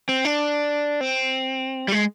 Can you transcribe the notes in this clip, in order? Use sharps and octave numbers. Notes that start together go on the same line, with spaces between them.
C4
D4
C4
G3
G#3